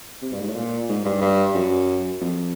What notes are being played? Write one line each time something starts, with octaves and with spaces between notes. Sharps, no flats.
C3
G2
G#2
A2
A#2
G#2
G2
G2
F#2
F2